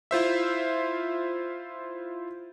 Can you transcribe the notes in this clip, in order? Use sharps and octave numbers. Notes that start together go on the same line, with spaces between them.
E4 F4 C5 E5